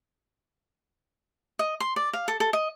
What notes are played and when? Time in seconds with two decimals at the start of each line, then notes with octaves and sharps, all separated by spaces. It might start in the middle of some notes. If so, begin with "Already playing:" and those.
1.59 D#5
1.80 C6
1.96 D5
2.13 F5
2.28 A4
2.40 A4
2.53 D#5